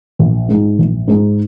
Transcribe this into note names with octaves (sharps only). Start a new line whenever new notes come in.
A#1
G#2 G#3 D#4
A#1
G#2 G#3 D#4